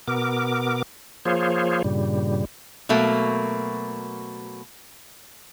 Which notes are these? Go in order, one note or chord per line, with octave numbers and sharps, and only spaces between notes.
B2 B3 A#4 D6
F3 A#3 F4 G#4 C5 C#5
G2 A#2 C#3 G3
B2 F#3 A3 A#3